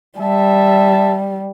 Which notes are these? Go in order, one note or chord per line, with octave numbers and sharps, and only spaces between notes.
G3 E5 A5